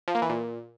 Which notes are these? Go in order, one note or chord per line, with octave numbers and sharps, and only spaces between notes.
F3
A#3
E3
A#2